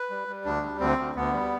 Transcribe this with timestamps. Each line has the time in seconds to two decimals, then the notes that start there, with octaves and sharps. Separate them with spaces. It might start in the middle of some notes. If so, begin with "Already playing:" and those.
Already playing: B4
0.10 G3
0.28 G3
0.45 D2 D4
0.63 G3
0.80 D2 C4
0.98 D2
1.15 D2 B3
1.33 G3